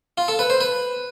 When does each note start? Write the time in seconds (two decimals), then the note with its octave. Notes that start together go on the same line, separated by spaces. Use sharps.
0.18 F4
0.28 A4
0.39 B4
0.50 C5
0.61 B4